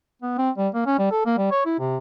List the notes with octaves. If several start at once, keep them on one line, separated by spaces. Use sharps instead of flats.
B3
C4
G3
A#3
C#4
G3
A4
A#3
G3
C#5
E4
C3